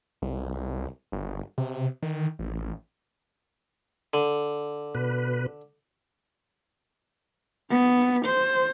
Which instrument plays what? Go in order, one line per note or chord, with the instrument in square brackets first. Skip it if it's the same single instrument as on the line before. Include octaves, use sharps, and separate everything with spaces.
[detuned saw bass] C2
G1
C3
D#3
A1
[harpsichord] D3
[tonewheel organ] B2 B4
[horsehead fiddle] B3
C5